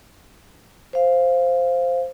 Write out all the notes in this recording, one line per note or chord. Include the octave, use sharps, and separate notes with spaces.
C5 F5